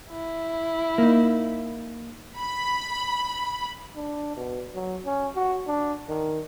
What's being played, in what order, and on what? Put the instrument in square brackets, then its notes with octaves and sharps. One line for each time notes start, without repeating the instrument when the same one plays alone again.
[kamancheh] E4
[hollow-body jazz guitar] A#3 D#4
[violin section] B5
[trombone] D4
B2
F#3
C#4
F#4
D4
D#3